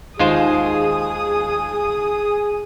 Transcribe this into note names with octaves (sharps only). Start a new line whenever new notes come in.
D#2 G#3 F4 G#4 C5 D#6